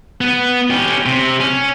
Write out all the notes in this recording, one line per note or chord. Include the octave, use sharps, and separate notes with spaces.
B3
C#4 G4
C3
C#4